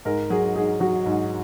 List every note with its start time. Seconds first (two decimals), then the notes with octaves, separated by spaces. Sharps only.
0.05 G#2 A#4
0.30 F#3 G#4
0.56 G#2 G#4
0.80 F#3 F#4
1.06 G#2